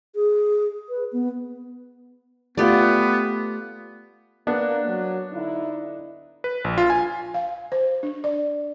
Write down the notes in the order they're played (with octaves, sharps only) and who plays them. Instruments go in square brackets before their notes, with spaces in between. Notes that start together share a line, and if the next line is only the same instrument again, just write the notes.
[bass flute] G#4
B4
B3
[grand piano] A3 F4 [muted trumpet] B3 [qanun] G4 D5
[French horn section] A#3 [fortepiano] B3 D4
[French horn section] F#3
D3 D#4 E4
[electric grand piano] B4
A#1
F4
G#5
[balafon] F5
C5
D4
D5